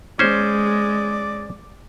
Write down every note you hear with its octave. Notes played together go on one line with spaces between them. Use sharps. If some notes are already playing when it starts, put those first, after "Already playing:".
G#3 C#4 C5 D5